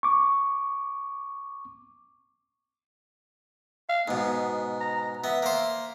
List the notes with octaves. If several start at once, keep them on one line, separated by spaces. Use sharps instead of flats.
C#6 D6
F5
G#2 B2 B3
A#5
B3 E5
A#3 C5